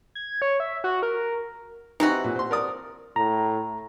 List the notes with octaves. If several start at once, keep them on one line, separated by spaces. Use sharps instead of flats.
G#6
C#5
E5
F#4
A#4
C3 E3 D#4 F#4
A#2
C5 C6
A#4 D5 D#6
A2 A#5